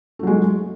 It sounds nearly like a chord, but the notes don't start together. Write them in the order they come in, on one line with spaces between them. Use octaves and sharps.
A3 F#3 G#3